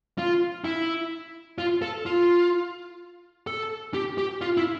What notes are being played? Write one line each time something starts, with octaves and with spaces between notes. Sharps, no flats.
F4
E4
F4
A4
F4
A4
G4
G4
F4
E4